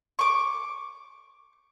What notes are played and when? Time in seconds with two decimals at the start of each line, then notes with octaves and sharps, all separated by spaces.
0.19 C#6 D6